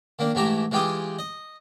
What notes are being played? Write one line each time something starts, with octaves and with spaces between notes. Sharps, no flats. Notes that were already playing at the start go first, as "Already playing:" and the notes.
D#3 A#3 D4
G#2 E3 A3 G4 E5 A#5
E3 G#3 F4 G4 G5 D#6
D#5